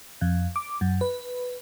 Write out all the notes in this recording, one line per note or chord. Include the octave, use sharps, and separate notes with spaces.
F2
D6
F#2
B4